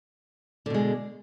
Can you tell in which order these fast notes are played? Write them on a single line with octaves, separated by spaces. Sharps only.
D3 B2 G#3